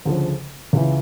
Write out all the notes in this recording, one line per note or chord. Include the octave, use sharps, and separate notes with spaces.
D2 C#3 F3
C#2 C#3 E3